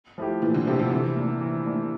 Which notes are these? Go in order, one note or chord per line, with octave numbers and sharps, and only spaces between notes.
F3 A3 E4 G4
A#2 E3
D3
C3 F3 A3 E4 G4
C3
C3 E3
A#3 D4
E3
A#3 D4